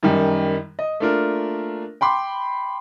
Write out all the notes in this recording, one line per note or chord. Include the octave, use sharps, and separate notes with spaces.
F#2 D#3 G3
D#5
A3 A#3 D4 F4 A#4
G5 B5 C6 D6